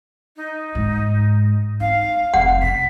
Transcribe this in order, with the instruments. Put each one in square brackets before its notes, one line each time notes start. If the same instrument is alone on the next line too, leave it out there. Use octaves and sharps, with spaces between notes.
[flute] D#4
[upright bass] G#2
[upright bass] D#4 [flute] F5
[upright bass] F1 F3 [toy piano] F#5
[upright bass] C#3 [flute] B6